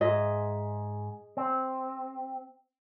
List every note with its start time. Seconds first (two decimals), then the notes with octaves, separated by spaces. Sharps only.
0.01 G#2 G#4 D#5 E5
1.37 C4